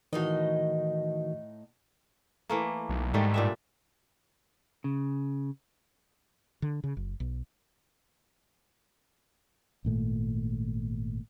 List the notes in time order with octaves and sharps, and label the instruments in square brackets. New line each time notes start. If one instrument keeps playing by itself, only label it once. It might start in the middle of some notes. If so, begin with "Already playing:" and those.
[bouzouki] A2 D#4 D#5 [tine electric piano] D#3 E3 F#4
[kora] E3 A3 A#3
[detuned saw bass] B1
[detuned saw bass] G#2 [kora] D#3 G3 A3
[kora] A#2 D4 E5
[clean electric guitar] C#3
[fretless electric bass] D3
C#3
F#1
B1
[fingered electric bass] G#1 A#2 A3